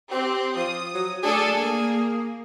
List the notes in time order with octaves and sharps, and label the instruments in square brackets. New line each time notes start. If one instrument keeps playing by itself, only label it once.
[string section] C4 [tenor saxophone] G4
[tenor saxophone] F3 [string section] D#6
[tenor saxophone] F#3
[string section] A3 D4 A4 [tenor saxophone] G#4
[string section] A#3